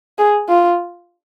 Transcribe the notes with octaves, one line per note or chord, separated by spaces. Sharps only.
G#4
F4